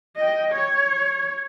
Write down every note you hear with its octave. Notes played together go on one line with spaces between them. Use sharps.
D#5 G5
C#5